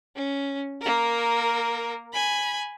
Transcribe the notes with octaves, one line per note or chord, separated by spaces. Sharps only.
C#4
A#3 A#4
G#5 B5